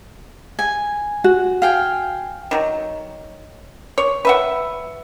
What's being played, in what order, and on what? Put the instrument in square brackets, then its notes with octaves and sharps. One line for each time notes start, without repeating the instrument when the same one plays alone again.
[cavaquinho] G#5
[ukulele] F#4
[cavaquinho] F5 G5 G#5
[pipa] D#3 F#3
C#5
B4 E5 F#5